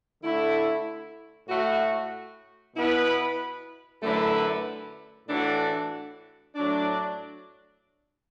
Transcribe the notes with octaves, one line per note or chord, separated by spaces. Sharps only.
D3 A3 E4 A4
A2 A3 F#4
B2 B3 E4 B4
F#2 D3 A3 E4 B4
A2 E3 D4 F#4 A4
A2 F#3 D4